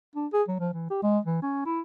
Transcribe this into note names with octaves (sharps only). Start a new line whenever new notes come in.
D4
G#4
F#3
F3
E3
G4
G#3
E3
C#4
E4